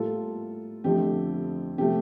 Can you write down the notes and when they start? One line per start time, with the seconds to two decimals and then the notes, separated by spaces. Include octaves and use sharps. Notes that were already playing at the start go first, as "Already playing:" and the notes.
Already playing: A2 G3 A#3 F4 A4
0.84 F2 D3 F3 A3 G4
1.78 C3 F3 A3 G4